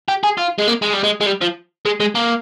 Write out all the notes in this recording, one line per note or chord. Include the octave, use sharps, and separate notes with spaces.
G4
G#4
F4
G#3
A#3
G#3
G3
G#3
G#3
G3
F3
G#3
G#3
A#3